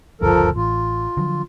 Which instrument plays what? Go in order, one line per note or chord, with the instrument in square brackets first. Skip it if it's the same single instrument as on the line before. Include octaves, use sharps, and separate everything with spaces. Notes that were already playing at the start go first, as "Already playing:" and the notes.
[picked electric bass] F#1 D2 G2 [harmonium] F3 A4 A#4
[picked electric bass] A1 [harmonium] F4
[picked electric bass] D3 F3 F#3